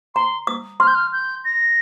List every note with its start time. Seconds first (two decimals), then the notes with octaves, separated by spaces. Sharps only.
0.15 A#5 C6
0.47 D#6
0.80 C6 F6
0.87 G6
0.95 F6
1.13 G6
1.45 A#6